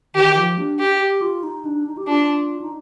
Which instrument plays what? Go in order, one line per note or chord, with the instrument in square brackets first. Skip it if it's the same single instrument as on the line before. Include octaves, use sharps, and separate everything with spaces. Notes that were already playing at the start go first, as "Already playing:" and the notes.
[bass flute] D#3 [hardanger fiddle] G4
[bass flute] F3
D4
[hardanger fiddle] G4
[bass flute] G4
F4
D#4
D4
D#4
G4
[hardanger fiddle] D4 [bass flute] F4
[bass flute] D#4